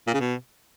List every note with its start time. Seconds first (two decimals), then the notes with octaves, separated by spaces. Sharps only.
0.07 A#2
0.14 C#3
0.20 B2